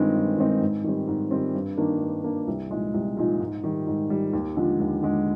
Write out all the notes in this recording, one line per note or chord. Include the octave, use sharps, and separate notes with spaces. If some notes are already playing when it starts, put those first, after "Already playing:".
Already playing: G2 D#3 G#3 C4 D#4
G2
D#3 G#3 C4 D#4
G#2
D#3 G3 C4
G#2
D#3 G3 C4
G2
D#3 A#3 D4
G2
D#3 A#3 D4
C2
A#2 F3 G#3 D#4
C2
A#2 F3 G#3 D#4
G#2
D#3 G3
G#2
D#3 G3
D#2
D3 F3 G#3
D#2
D3 F3 G#3